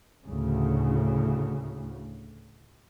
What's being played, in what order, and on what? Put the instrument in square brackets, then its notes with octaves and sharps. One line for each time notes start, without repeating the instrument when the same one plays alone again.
[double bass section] D2 A2 C#3